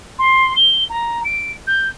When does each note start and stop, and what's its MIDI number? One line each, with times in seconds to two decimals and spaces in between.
0.18 0.53 84
0.55 0.84 103
0.89 1.21 82
1.24 1.52 98
1.67 1.88 91